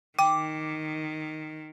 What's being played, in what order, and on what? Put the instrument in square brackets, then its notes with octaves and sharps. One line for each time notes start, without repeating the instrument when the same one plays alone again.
[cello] D#3 [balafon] G5 [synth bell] D6